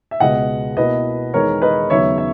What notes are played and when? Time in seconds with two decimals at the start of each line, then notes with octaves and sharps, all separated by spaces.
0.11 E5
0.20 C#2 B2 G#3 D#5 F#5
0.77 B2 A#3 E4 B4 D#5
1.34 E2 D#3 G#3 A#4 C#5
1.62 B4 D#5
1.90 D#2 C#3 F#3 B3 D#4 C#5 E5
2.18 E5